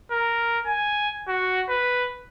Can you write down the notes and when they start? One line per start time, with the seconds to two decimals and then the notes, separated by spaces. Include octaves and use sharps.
0.11 A#4
0.66 G#5
1.28 F#4
1.69 B4